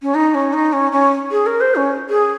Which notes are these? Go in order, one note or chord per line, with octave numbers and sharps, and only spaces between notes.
C#4
D#4
C#4
D#4
C#4
C#4
G#4
A#4
C5
C#4
G#4